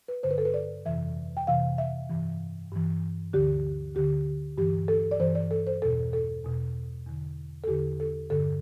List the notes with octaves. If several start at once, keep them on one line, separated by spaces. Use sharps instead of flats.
B4
G2 D3 C5
B4
A4
B4
D5
F2 C3 E3 E5
G5
F2 C3 E3 F5
E5
G2 E3
G2 E3
D2 D3 G4
D2 D3 G4
G2 E3 G4
A4
D5
G2 E3 C5
D5
A4
C5
E2 B2 A4
A4
E2 B2
E2 D3
A4
E2 D3 G4
A4
G2 D3 A4